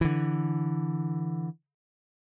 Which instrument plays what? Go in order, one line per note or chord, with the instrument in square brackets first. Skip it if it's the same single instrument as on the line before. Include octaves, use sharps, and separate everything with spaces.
[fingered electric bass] D3 E3